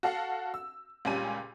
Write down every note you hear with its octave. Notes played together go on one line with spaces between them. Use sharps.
F#4 A4 F5 F#5
E6
C#2 A#2 G3 C#4 G#5 D#7